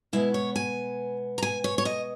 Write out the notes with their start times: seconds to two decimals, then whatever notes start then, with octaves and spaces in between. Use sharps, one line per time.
0.13 B2 G#3 B3 E4
0.34 C#5
0.56 G#5
1.38 A#5
1.42 G#5
1.64 C#5
1.78 C#5
1.85 D#5